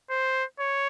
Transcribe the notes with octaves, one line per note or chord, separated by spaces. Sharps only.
C5
C#5